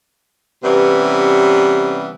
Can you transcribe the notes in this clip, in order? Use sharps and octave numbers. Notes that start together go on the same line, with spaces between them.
C3 E3 G3 B3 C#4